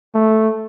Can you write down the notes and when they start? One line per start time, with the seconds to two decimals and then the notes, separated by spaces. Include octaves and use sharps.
0.14 A3